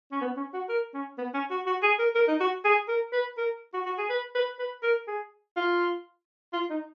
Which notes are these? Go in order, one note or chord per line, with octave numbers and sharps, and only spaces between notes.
C#4
B3
C#4
F#4
A#4
C#4
B3
C#4
F#4
F#4
G#4
A#4
A#4
D#4
F#4
G#4
A#4
B4
A#4
F#4
F#4
G#4
B4
B4
B4
A#4
G#4
F4
F4
D#4